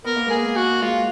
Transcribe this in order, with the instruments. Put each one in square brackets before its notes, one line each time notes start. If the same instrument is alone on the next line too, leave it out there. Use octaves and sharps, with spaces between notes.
[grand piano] B3 [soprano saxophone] A#4
[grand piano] A#3
[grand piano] G#3 [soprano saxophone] G#4
[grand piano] A#3
[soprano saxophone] F#4
[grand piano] G#3 [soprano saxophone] F4